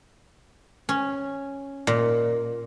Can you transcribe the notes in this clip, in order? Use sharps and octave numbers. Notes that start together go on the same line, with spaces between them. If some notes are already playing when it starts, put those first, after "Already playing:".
C#4
A#2